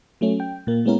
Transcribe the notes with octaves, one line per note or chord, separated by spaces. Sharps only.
F#3 A3 C#4
G5
A#2 A#3
G#3 A#3 B3 C#4 E4 A#4